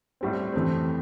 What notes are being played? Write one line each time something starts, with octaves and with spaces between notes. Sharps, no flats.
A2 G3 C4
F2 E3 A3 C4